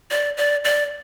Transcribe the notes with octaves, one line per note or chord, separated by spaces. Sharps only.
D5
D5
D5